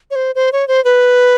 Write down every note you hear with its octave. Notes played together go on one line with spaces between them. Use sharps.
C#5
C5
C5
C#5
C5
B4